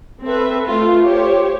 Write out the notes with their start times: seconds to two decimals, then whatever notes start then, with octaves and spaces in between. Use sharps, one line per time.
0.24 C4 A4 B4 E5
0.67 A3 F4
1.04 G4 C5 C#5